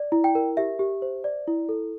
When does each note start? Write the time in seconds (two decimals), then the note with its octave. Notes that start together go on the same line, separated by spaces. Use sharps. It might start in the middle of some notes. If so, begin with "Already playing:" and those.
Already playing: D5
0.12 E4
0.24 G5
0.35 A#4
0.57 G4 E5
0.79 G4
1.02 C5
1.24 D5
1.48 E4
1.69 A4